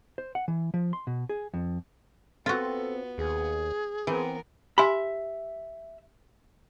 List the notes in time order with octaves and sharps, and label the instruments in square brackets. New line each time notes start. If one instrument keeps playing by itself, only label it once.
[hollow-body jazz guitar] C5
F#5
E3
F3
C6
B2
G#4
F2
[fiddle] B3 [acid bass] C4 [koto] F4 F#4 [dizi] A4
[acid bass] D#2 [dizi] G#4
[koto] E3 [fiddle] B3 A#4 [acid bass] C4
[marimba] G4 G#5 C6 [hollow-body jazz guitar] E5 B5